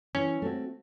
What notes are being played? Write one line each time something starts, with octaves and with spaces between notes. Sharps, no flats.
E3 C#4
A3 C4 F#4